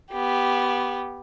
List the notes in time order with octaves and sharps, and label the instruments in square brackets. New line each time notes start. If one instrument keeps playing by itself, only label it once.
[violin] B3 G4